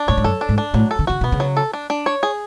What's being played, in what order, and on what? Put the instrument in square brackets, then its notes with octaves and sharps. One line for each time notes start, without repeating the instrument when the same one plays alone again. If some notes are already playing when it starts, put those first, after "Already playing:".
Already playing: [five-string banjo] D4
[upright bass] A2 [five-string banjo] C#5
[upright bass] G#2
[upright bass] F#2 [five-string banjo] A4
[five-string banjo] D4
[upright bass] G#2
[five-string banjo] D4
[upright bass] A2 [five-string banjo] F#3
[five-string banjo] A4
[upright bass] D3
[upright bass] C#3 [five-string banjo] F#4
[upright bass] B2 [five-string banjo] B3
[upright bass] C#3
[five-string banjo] F#3
A4
D4
D4
C#5
G#4